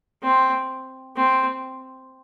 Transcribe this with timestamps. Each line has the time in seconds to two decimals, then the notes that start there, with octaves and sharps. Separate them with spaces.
0.23 C4
1.16 C4